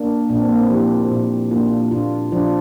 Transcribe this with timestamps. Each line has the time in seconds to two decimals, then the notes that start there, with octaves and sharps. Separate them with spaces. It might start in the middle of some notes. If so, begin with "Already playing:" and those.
Already playing: A#3 D4
0.29 A#2 D4
0.40 C4
0.49 A#3
0.59 C4
0.70 F3 E4 G4
1.11 A#2
1.51 A#3 D4 F4
1.91 A#2 D4 F4
2.32 F3 D4 F4